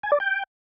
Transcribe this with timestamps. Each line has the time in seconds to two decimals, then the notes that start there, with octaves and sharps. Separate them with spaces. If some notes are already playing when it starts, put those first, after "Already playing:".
0.03 G#5
0.12 D5
0.20 G5